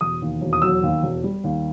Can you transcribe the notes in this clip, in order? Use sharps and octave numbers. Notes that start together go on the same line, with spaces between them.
E1 D#6
D#2
E1
D#6
F#3 E6
D#2
E1
G3
D#2